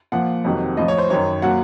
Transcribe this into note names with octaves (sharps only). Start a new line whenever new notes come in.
A#2 F3 F#5
F2 C3 D#3 F#3
A2 F3 D#5
C#5
C5
F#2 D#3 F#3 C#5
A#2 F#3 F#5